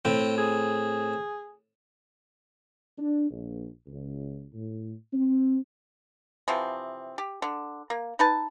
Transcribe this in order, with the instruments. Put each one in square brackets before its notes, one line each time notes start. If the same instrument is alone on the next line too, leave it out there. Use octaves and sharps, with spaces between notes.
[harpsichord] A2 C4 [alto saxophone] G5
[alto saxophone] G#4
[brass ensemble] D4
A#1
C#2
A2
C4
[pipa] C3 E3 F3 C4
G4
D3
A#3
D#4 B4 A5